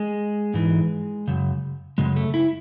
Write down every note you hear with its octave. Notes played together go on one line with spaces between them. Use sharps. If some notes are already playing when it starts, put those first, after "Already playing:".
Already playing: G#3
G#2 E3
F#2 C#3
F#2 C#3 G#3
A3
E4